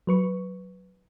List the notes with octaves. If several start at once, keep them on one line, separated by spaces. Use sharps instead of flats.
F#3 B4 C#6